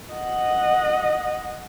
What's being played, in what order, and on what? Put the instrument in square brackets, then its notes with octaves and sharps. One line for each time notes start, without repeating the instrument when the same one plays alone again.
[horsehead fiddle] D#5 F#5